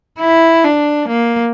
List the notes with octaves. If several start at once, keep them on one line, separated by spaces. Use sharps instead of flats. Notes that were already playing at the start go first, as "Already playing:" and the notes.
E4
D4
A#3